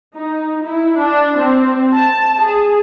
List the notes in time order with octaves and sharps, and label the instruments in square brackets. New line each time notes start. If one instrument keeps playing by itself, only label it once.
[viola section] D#4
E4
D4
C4
A5
G#4